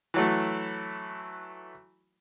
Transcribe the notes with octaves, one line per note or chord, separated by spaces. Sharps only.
E3 F#3 A3